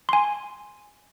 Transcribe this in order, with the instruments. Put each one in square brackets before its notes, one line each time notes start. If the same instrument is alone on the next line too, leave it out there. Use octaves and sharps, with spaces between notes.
[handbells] G#5 C6